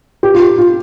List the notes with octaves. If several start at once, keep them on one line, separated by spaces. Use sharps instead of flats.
G4
F4
G4
F4